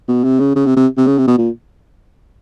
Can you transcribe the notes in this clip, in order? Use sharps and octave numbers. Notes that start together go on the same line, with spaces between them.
B2
C3
C#3
C#3
C3
C3
C3
C#3
C3
B2
A#2